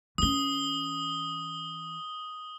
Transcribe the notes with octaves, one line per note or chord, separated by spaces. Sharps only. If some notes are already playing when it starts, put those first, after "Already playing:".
E3 C#4 D#6 G7